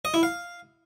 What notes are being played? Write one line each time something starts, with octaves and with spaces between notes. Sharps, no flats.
D#5
E4
F5